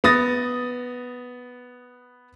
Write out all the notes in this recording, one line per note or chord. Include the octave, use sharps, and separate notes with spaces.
B3 D#6 A6 A#6